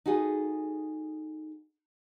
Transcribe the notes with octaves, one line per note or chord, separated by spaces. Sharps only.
D#4 F#4 G#4 A4